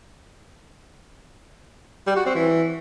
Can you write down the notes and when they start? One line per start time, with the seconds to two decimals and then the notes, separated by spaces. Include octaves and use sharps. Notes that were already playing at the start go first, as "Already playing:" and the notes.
2.07 G3
2.16 F#4
2.26 C4
2.35 E3